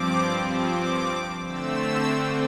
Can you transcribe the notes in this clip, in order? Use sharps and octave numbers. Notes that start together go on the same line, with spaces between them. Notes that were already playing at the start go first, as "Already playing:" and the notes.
Already playing: G2 F3 C4 D6
D6
D3 A3 C4 E6